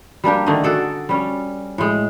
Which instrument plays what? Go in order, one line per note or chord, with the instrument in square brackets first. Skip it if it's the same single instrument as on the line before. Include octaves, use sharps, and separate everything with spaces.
[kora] G3 A#3 D4 G4
D3 D#3 A3 D#5
F#4 G#4 A4 D5
G3 C#4
A2 G#3